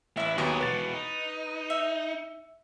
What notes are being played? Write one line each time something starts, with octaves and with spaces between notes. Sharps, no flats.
A1 E4 B4 E5
D#2 D#3 F#3 B3 G#4 C#6 D6
E2 B2 B4 A6
D#4
E5